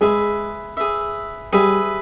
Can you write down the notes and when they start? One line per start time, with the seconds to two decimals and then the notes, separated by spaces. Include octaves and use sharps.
0.01 G#3 G#4 B4 E5
0.77 G#4 B4 E5
1.52 G3 G#4 B4 E5